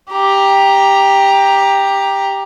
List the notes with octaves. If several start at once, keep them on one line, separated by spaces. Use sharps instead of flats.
G4 A#5